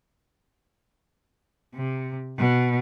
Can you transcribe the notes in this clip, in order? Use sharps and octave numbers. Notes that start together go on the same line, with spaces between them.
C3
B2